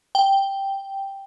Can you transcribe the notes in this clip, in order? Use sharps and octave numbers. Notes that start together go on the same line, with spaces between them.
G5